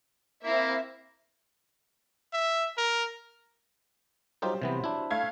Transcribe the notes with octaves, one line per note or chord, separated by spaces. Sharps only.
A#3 C4 E4 E5
E5
A#4
F#3 G3 D#4 F4 G4 C5
C3 E3 B3
D4 E4
A3 F5 G#6